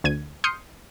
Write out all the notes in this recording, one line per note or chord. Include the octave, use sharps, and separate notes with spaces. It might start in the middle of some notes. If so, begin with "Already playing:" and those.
D2 G#6 D#7
C6 D#6 F6 G6 C7 C#7